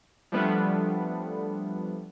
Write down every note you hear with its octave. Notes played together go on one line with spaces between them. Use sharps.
F3 G3 A3 B3 D4